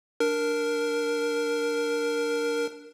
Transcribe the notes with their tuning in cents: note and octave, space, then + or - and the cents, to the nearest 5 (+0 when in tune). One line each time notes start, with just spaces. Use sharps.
D4 +0 A#4 +0